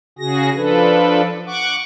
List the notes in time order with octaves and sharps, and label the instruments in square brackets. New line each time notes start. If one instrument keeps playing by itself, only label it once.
[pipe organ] C#3 F#4 G#4 A#6
F3 D4 A4 B4
F#5 C#6 D6